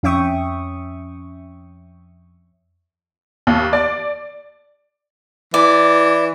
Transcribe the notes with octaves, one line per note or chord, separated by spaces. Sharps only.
F2 C#4 E5 G5 C#6 D#6
D#2
D5
E3 D5